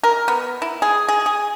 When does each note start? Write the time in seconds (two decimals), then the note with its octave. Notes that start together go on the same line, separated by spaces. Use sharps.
0.03 A#4
0.28 B3
0.62 E4
0.82 G#4
1.08 G#4
1.26 G#4